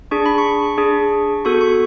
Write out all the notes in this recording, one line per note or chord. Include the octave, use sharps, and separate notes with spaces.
D4 G#4 C#6
B5
C#6
D4 G#4
B3 F#4 A4 C#6
C#6